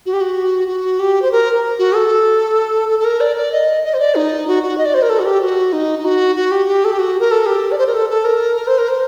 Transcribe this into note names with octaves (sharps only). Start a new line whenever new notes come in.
F#4
G4
F#4
F#4
G4
C5
A#4
F#4
A4
A4
A4
A#4
D5
D5
D#5
D#5
C5
D5
D#4
F#4
F#4
D#5
D5
C5
A#4
A4
F#4
G4
F#4
D#4
D#4
F#4
F#4
G4
G4
A4
G4
F#4
A#4
A4
G4
D5
C5
A#4
A4
A4
A#4
A#4
C5
A#4
C5